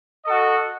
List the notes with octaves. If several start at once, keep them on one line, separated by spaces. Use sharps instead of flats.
F#4 A4 D#5